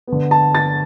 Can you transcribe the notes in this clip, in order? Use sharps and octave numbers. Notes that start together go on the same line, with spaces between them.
D3 B3
A5
A6